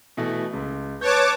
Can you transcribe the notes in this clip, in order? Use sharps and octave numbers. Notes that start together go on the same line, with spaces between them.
B2 E3 A3
C#2
B4 C#5 A5 D6 G6